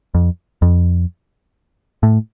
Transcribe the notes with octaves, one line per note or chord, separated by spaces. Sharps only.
F2
F2
A2